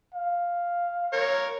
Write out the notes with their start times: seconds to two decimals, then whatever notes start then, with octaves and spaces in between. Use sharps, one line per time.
0.14 F5
1.13 A#4 C#5